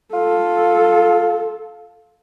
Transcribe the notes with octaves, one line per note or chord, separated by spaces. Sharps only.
F4 A4